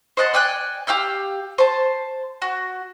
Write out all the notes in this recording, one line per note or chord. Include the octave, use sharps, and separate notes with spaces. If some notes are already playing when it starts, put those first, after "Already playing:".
C5 D#5 F#5 A5
D5 G5 G#5 F#6
G4 F5 E6 G6
C5 A5
F#4